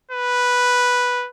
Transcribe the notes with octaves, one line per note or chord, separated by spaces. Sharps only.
B4